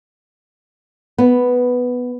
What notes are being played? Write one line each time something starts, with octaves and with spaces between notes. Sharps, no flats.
B3